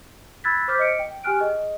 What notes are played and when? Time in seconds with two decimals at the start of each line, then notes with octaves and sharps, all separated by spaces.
0.44 B5 E6 F#6 G#6 A6 B6
0.68 C5 D6 F6 G6 B6
0.79 D#5 C#7 D7
0.99 G5
1.24 G4 G5 G#5 F6 F#6 D7
1.39 G#4 D#5